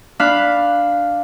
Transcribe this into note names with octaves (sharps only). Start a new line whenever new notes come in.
D4 F5 B5 F#6